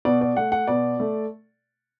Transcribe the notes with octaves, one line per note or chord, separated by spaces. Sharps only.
B2 D5
D5
A3 F#5
F#5
B2 D5
A3